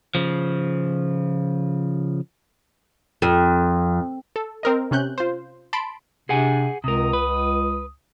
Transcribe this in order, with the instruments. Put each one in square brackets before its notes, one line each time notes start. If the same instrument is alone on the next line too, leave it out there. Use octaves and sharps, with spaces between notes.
[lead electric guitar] C#3 F3
[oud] F2
[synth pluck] A4
C4 A#4 D#5
C3 C#4 F#6 G6
F4 C5
A5 B5 C6 D7
[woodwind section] C3 D4 [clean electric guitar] G#4 F#5 G#5
[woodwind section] C#2 D#6 [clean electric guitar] C3 A#4
[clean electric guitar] B4